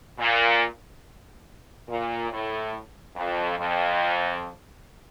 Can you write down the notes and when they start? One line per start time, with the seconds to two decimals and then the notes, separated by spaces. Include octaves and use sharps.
0.19 A#2
1.89 A#2
2.31 A2
3.16 F2
3.57 F2